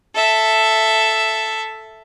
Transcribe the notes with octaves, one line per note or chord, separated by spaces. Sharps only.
A4 E5